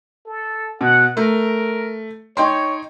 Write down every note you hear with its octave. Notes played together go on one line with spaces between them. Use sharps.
A4
B2 F#5
A3 A#4
D#4 C#5 G5 C6